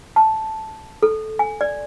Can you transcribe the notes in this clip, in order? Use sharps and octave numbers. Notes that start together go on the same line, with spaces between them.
A5
A4
G#5
D5